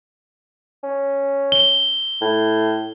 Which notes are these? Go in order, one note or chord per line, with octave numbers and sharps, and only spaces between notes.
C#4
G7
A2